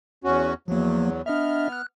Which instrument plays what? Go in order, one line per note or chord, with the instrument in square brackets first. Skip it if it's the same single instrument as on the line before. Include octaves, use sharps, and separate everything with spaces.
[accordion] E2 C#4 F#4
[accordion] E2 F#3 [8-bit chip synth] F3 A#3
[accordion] B3 F6 [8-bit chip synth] D4 D#5 E5
[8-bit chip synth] F#6